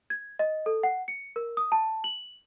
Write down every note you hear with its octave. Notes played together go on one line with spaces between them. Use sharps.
G#6
D#5
A4
F#5
C#7
A#4
D#6
A5
F#7